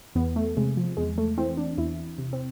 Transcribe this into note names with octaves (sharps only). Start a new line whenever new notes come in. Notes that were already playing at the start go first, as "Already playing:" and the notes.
E2 B3
A3
C3 G#3
F3
E2 G#3
A3
E3 C4
D4
E2 E4
C3
C4